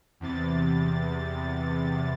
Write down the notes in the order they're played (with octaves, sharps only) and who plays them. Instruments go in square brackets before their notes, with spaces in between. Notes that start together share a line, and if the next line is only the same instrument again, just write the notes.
[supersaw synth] E2 C3 A6